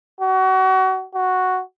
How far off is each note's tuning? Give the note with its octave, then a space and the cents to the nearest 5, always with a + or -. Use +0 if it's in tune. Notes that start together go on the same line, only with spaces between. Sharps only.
F#4 +30
F#4 +0